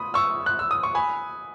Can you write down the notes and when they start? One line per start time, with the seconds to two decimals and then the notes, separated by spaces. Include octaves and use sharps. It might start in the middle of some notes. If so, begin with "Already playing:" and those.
Already playing: B5 D#6
0.14 C#6 E6
0.46 F#6
0.59 E6
0.71 D#6
0.83 C#6
0.95 G#5 B5